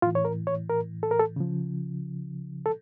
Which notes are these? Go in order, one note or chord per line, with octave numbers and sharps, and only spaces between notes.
A2 E3 F4
C#5
A#4
C#5
A#4
A4
A#4
A4
C#3 F3
A4